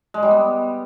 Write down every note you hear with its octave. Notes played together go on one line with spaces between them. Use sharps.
G#3
G3
B3